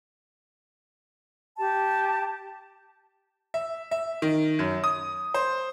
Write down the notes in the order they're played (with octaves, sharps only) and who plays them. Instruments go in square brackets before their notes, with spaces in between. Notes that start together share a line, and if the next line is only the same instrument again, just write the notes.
[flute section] G4 A5
[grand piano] E5
E5
D#3
F#2
D#6
C5